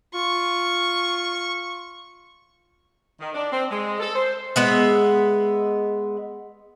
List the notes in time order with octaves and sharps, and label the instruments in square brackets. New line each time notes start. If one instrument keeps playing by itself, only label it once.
[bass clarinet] F4 [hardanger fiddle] C#6
[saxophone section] D#3
D4
C4
G#3
A4
C5
[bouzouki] G#3 B3 E5